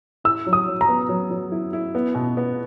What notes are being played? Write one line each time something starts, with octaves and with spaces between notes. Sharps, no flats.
E4 E6
F#3
D#6
F#3
A#5
B3
F#3
F#3
E4
E4
B3
B2
B3